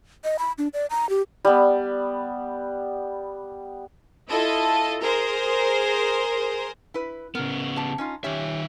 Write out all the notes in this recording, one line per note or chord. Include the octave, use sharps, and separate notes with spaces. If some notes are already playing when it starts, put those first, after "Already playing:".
D#5
B5
D4
D5
A#5
G4
G3 B3
E4 F4 A4 D#5
G#4 A#4 C5
E4 B4
C#3 B3 A#4
G4 A5
C#4 D#4 F4
D#3 C#4 G4 C#5 E5